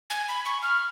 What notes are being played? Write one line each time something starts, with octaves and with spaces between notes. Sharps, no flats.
G#5
B5
C#6
F6